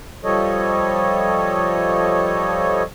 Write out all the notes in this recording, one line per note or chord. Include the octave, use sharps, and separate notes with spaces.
F3 G3 A4 C#5 D#5